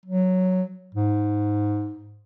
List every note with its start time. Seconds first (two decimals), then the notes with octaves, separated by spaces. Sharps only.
0.06 F#3
0.95 G#2